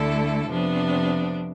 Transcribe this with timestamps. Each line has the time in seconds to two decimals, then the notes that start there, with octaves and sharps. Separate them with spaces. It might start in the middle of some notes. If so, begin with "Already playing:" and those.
Already playing: D2 D3 A3 E4 A4
0.48 F2 C3 F3 B3 D4